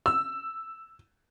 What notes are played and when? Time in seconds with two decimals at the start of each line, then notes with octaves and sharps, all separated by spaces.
0.06 E6